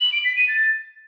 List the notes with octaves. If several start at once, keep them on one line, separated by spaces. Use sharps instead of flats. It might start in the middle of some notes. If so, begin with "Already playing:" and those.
F#7
D7
B6
D#7
A6